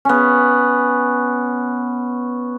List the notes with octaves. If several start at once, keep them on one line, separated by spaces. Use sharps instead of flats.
B3 C#4